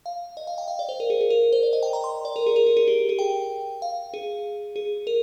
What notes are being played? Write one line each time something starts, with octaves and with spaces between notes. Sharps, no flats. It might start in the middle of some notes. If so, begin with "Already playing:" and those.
F5
D#5
F5
G5
F5
D5
C5
A#4
G#4
G#4
A#4
C5
D5
D#5
G5
A#5
C6
D5
A#4
G#4
A#4
G#4
G#4
G4
G#4
G5
F5
G#4
G#4
A#4